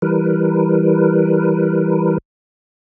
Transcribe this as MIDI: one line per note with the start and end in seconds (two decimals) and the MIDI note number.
0.02 2.18 52
0.02 2.18 55
0.02 2.18 70
0.02 2.18 71